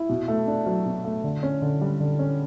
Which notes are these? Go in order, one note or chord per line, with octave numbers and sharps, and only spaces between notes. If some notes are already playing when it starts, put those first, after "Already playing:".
Already playing: E4
B2
A3
D4
F#3
B2
A3
D3
C#4
D3
G3
D3
C#4